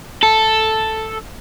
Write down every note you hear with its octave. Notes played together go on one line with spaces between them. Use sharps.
A4